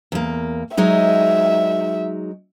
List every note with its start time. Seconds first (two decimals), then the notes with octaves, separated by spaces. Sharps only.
0.12 E2 A#3
0.77 F#3 G#3 D#4 E5